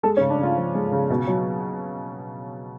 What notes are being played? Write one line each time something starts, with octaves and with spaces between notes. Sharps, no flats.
G#3 A4
C#4
C#3
D4
C#3 F4
F3
G#3
C#3
B2
F#3